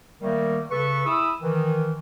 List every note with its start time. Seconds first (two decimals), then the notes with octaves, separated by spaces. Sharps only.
0.21 D#3 G3 A3 A#3
0.71 C#3 A4 B4 C#6
1.06 E4 G#4 B5 D#6 E6
1.41 D#3 E3